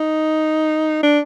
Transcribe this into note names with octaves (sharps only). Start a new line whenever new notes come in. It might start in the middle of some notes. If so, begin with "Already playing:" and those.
Already playing: D#4
D4